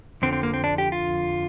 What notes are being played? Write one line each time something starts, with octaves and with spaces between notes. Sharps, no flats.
F2 D3 F3 C4
C4
A#3
C4
D4
G4
F4